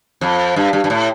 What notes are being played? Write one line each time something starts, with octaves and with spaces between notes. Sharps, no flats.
F2
G2
G2
G2
A2